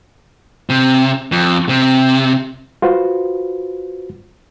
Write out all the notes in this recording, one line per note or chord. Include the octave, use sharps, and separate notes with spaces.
C3
F2
C3
F4 F#4 B4 C5